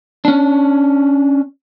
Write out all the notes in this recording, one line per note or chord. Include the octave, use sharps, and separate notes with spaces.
C#4 D4